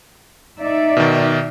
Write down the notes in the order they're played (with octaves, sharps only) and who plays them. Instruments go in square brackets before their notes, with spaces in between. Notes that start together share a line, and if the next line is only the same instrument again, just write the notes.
[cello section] D#4 D5 E5
[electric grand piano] B2 D#3